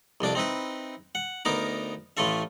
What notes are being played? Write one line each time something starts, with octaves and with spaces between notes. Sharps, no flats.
C2 F2 D4 D6
C4 D#4 E4 B4
F#5
D2 B3 D#4 A#4 D6
A1 A2 A3 F4 A4 E5